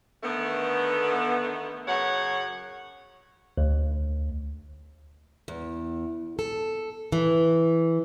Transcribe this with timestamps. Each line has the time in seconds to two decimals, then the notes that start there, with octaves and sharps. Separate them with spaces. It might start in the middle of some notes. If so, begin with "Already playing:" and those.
0.24 D3 D#3 A3 B3
1.87 F#2 C#3 C#5 F#5
3.57 D2
5.48 E2
6.39 A4
7.12 E3